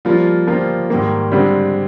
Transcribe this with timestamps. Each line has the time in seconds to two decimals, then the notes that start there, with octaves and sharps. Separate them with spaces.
0.05 F3 G3 A#3 F4
0.47 F3 G3 A#3 F4
0.90 G#2 D#3 G3 A#3
1.32 D3 G3 G#3 C4